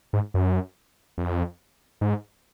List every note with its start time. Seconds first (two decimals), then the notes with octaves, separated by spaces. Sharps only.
0.13 G#2
0.34 F#2
1.18 F2
2.01 G#2